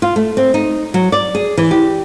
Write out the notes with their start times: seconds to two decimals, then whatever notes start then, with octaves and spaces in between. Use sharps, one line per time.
0.02 F4
0.16 A3
0.37 C4
0.54 D#4
0.94 F#3
1.12 D5
1.35 G#4
1.58 E3
1.71 G4